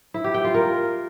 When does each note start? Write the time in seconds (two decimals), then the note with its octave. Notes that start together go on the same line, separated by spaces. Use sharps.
0.14 E4
0.24 G4
0.34 G5
0.44 F4
0.54 A#4